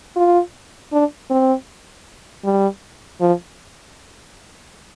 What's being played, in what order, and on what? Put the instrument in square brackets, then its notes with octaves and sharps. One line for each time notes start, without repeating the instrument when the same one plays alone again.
[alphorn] F4
D4
C4
G3
F3